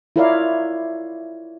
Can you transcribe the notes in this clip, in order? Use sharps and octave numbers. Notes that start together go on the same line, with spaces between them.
E4 F4 A#4 C#5 D5 F5